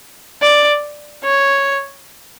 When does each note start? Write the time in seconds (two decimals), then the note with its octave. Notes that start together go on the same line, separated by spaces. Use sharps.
0.42 D5
1.24 C#5